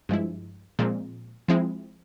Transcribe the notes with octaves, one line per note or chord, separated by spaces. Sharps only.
G2 F3 G#3 E4
A#2 F3 G#3 C4
F3 G#3 C4 E4